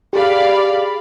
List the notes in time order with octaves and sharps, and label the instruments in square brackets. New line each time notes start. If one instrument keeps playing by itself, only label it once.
[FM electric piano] G4 G#4 [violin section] D5 F5 B5